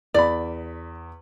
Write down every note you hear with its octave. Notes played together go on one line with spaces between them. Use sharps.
E2 D5 B5